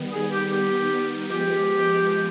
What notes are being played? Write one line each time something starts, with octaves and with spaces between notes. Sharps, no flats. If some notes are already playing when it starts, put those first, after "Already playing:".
Already playing: D#3 G3 B3
G#4
G4
G4
F3 G#3 B3 G4